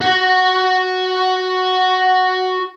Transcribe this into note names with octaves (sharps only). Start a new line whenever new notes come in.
F#4 F#5